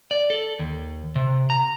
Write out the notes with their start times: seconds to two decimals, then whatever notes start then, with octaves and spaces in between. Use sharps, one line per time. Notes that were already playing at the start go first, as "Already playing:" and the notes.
0.11 D5
0.30 A4
0.59 D#2
1.16 C3
1.50 A#5